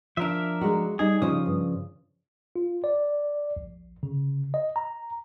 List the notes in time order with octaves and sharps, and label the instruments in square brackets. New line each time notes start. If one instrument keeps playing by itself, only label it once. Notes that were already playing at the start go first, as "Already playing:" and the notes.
[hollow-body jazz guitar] F3 D4 [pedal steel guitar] A#4 E5
[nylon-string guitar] G#3 F#4
[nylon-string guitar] G3 D#4 [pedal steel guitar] G#4
[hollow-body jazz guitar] C#3 F3 [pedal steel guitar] D#6
[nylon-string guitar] G2
[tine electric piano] F4
D5
A#1
C#3
D#5
A#5